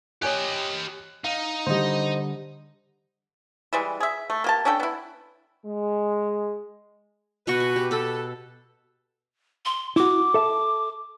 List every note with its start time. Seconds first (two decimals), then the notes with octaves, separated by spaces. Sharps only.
0.22 G4 C#5 D#5 G#5 F#6
1.24 D#4 F5
1.67 D3 G3 C5 D#5
3.73 E3 G3 G#3
4.00 G#4 E5
4.30 A3
4.44 A#3 G4 A5
4.65 C#4 D4 A4 G5
4.80 B3 E4
5.65 G#3
7.47 B2 F#4 B4 D#5 C#6
7.60 G#5
7.76 G4
7.91 A4 B4 B5
9.65 C6
9.96 E4 F#4 D6
10.34 A4 E5 A5